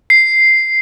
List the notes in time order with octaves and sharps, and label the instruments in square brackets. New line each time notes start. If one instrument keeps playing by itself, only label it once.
[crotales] C7